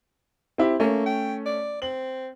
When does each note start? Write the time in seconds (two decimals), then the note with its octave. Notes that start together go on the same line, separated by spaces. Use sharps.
0.58 C4 E4 G4
0.80 A3 A#3 C#4
1.06 G5
1.46 D5
1.82 C4 F#7